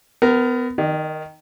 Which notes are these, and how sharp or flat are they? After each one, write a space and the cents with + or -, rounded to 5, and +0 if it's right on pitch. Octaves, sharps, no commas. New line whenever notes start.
B3 +30 A#4 +0
D#3 +0 D5 +45